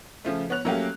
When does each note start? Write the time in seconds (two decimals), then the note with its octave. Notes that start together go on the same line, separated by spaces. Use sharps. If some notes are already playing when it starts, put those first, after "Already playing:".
0.25 C#3 F3 A3
0.50 B3 C#5 F#6 F7
0.65 F#3 A3 A#3 C#4 G4